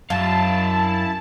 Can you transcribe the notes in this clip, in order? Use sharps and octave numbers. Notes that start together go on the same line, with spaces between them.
F#2 E4 F5 A5